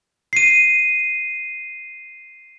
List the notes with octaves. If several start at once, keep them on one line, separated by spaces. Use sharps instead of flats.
C7 D#7